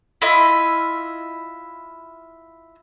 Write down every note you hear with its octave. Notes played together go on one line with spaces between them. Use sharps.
E4 F4 D#5 E5